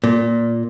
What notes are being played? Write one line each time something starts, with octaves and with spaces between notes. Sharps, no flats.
A#2